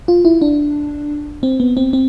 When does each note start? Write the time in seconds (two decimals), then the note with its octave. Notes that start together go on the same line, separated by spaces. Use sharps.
0.08 F4
0.25 E4
0.42 D4
1.43 C4
1.60 B3
1.77 C4
1.93 C4